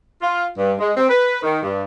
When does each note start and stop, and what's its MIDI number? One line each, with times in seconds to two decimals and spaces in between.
0.22 0.44 65
0.58 0.74 43
0.80 0.92 56
0.97 1.08 60
1.09 1.40 71
1.43 1.62 51
1.63 1.84 43